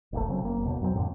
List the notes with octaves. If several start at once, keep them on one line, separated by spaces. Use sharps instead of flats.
E1 A#1 C3 A3
C#3 F#3 C4
F#1 A#3
D#2 B2
F#2 F#3 A#3 C4
F2 A2 D3